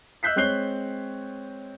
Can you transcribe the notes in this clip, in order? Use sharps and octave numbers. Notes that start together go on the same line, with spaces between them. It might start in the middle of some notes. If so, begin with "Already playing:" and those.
D#5 E6 F#6 G6 B6 C7
G#3 C4 C#5 F#6 C7 G7